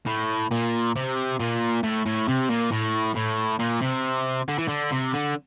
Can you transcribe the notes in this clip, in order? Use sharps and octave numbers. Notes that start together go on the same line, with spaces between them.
A2
A#2
C3
A#2
A2
A2
C3
A#2
A2
A2
A#2
C3
D3
E3
D3
C3
D3